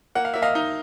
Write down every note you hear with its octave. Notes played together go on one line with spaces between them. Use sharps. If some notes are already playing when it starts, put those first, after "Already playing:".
A#3 F#5
F5
A#3 E5
D#5 F5
D#4